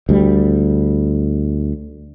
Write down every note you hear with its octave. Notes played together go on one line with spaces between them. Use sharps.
D2 G3